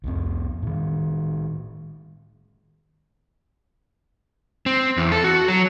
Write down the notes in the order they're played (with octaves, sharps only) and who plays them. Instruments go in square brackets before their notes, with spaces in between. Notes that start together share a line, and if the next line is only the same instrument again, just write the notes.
[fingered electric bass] C2 F2 C4
A2 D#3
[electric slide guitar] C4
E2
A4
F#4
F#3